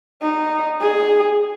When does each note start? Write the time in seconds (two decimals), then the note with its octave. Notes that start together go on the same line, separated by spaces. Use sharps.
0.22 D#4
0.81 G#4